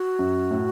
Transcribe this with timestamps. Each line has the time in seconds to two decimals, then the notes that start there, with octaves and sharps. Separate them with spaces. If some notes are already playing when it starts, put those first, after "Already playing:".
Already playing: F#4
0.19 F#2
0.51 A2